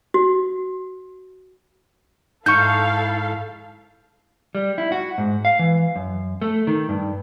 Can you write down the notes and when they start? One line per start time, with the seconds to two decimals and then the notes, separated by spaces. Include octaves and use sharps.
0.14 F#4
2.46 G#2 D#4 E4 A4 F5 C#6 G6
4.55 G3
4.78 E4
4.92 F#4
5.18 G#2
5.45 F5
5.59 E3
5.96 F#2
6.42 A3
6.67 D#3
6.89 G2